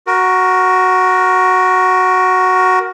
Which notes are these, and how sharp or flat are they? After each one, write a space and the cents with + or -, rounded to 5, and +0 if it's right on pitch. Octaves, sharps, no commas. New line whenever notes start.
F#4 +0 A#4 +15